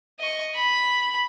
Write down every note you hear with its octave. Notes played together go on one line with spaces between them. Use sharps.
D#5 C#6
B5